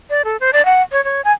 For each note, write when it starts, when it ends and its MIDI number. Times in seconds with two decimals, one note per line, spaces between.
0.10 0.22 74
0.25 0.37 69
0.40 0.51 72
0.53 0.65 74
0.65 0.82 78
0.92 1.03 73
1.04 1.21 73
1.25 1.32 80